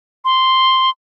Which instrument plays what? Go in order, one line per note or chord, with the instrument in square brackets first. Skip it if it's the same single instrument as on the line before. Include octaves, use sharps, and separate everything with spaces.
[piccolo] C6